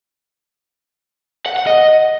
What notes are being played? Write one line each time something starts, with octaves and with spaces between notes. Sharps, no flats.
F#5
F#5
D#5